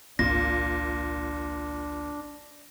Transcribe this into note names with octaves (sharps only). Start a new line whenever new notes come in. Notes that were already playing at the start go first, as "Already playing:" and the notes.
G#1 C#2 A#2 D4 A#6